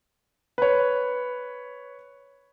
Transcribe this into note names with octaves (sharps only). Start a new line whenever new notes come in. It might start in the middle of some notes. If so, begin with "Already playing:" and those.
B4 C#5